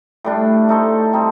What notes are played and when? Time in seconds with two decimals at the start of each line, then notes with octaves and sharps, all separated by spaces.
0.24 A2 G3 D4
0.69 A3 D#4 A4 C5
1.13 G3 C4 D#4 A4